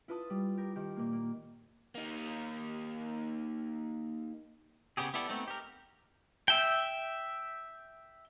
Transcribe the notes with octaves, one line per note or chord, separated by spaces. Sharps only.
E4 F4 B4 A5 D#6
G3
G4 A#4
D#3 G4
A#2 A#3
A#3
A#3 D#4
C#3 B3 C#4 G4 G#4
B3 E4 G4 A4 D5
A3 B3 C4 D#4
G4 A#4
E5 G5